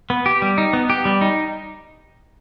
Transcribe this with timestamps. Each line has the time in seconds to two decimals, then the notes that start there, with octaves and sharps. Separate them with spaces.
0.10 B3
0.26 G4
0.42 G3
0.58 D#4
0.73 B3
0.90 G4
1.05 G3
1.21 D#4